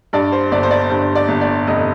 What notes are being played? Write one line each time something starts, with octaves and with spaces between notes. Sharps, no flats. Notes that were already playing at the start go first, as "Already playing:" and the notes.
G2 D5
C5
G1 D5
C5
D5
G2 C5
D5
G1
D5
F1 D#5